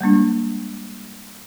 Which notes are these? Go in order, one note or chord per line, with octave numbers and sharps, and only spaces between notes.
G3 G#3 A#3 D4